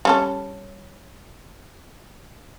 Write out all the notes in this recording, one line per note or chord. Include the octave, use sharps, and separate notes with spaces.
G3 C#4 A4